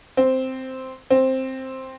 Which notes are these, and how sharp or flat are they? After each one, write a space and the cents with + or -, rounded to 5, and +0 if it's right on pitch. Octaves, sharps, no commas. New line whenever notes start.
C4 -5
C4 +5